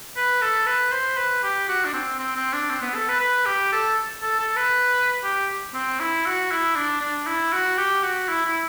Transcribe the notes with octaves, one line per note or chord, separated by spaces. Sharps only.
B4
A4
B4
C5
B4
G4
F#4
D4
C4
C4
C4
D4
C4
B3
A4
B4
B4
G4
A4
A4
A4
B4
G4
C4
E4
F#4
E4
D4
D4
E4
F#4
G4
F#4
E4
E4